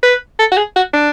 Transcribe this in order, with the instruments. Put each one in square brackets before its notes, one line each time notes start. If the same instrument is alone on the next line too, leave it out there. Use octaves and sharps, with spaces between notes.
[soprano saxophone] B4
A4
F#4
G#4
F#4
D4